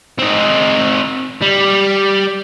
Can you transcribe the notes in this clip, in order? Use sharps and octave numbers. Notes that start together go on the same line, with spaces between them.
C4 D#4
G3